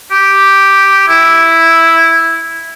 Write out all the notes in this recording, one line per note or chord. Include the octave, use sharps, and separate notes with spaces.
G4
E4